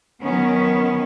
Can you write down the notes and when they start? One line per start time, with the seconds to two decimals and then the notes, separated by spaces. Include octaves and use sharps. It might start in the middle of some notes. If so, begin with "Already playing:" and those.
0.23 D#3 F#3 B3 C#4